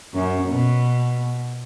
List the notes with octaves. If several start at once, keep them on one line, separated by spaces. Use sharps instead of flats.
F#2
B2